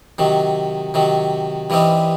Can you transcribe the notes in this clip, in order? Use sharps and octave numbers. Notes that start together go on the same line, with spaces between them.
C3 D#3 F#3
C3 D#3 F#3
G2 E3 G3 C4 D#4